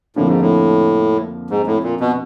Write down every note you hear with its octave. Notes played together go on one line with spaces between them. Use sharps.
F2 A2 D3 F3 A#3 D4
G#2
A2
G#2
A2
A#2
B2